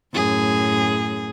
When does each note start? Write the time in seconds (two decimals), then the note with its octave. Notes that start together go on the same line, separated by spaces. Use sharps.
0.14 F#2 A2 G#4